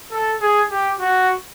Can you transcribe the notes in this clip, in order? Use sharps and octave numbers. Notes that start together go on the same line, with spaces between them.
A4
G#4
G4
F#4